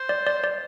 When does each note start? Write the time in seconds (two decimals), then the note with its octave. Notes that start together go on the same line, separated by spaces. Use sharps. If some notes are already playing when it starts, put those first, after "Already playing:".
Already playing: C5
0.09 D5
0.27 D5
0.44 D5